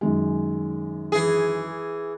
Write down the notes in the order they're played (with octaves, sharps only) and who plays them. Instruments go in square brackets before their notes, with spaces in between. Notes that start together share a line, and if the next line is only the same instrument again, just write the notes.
[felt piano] F#2 D#3 G#3
[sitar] E3 G#4